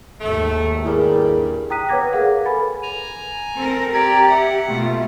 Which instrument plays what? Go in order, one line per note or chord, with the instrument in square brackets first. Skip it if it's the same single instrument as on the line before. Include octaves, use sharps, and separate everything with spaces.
[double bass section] G#1 D#2 [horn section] A3
[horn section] G2 G3 [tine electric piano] E4 G#4 A#4
[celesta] G5 A#5 D#6 F#6 B6 D#7
B4 C#5 F#5 D6 G#6 A#6
G#4 A#4 F5 F#5
A4 B4 G#5 B5 A6
[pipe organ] G#5 A#5
[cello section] C4 A4 A#4
[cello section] G4 [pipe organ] D5 G5 G#6 [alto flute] A#5
[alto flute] E5 [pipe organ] F#5
[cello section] B2 A3 F4